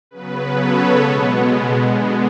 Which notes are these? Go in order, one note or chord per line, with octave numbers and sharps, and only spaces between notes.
C#3 F#3 B3 B4
A4 C#5
B2 G#3 B3
D3 G#3 B3